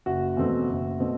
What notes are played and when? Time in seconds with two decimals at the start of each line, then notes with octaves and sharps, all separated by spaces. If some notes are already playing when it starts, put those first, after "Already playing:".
0.06 F#1 F#4
0.37 E2 B2 A3 C4
0.67 F#1
1.00 B2 A3 C4